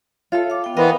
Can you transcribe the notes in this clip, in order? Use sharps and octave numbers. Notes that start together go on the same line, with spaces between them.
F4 A4 C#5 E5
F5 D6
B3 G5
E3 B3 A#4 C5 D#5 F5 G5